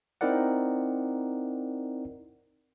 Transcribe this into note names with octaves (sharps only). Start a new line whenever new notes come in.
C4 D#4 E4 A#4 D5 F#5